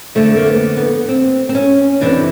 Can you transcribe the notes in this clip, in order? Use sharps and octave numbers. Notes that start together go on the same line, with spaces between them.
F2 D3 A3
A#3
B3
B3
C4
C4
C#4
F2 C3 E3 D4